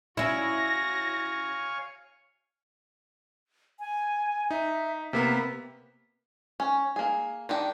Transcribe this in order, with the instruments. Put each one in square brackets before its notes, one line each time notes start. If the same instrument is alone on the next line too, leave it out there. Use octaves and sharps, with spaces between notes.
[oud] C#4 E4 [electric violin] F#4 A#6 [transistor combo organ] C#5 F5 G#5
[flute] G#5
[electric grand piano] D#4 [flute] E5
[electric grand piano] C3 A#3 B3 [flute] B6
[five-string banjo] C#4
A#3 G#4
D#3 D4 G4